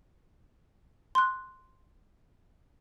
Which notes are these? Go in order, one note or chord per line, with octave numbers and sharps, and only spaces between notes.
C6 F#6